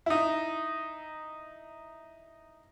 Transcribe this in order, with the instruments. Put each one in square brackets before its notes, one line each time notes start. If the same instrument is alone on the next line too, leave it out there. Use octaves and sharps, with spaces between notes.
[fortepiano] D#4 E4